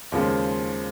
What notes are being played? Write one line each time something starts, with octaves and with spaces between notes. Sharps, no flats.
D#2 C#3 F3 G#3 C4